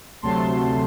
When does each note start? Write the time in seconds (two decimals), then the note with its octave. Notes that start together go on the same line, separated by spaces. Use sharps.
0.22 D2 C3 F#3 A3 A5 C6